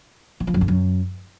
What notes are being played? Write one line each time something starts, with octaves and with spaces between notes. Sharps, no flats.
E3
F3
F#2
D3
F#2